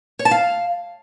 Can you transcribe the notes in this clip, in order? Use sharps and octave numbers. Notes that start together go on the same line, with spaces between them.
C#5
A5
F5